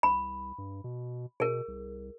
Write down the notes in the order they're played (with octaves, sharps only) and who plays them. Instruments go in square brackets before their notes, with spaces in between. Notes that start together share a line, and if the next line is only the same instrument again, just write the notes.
[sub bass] C2 [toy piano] B5
[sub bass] G2
B2
[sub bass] B2 [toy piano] G#4 A#4
[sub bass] C2